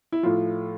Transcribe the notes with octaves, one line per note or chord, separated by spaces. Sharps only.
E4
A2 F3 F4